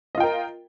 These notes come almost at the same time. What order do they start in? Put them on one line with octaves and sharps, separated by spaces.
D#5 F4 G5 A#4